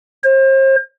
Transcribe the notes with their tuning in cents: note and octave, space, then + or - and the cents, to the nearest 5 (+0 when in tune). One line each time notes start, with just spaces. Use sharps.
C5 +40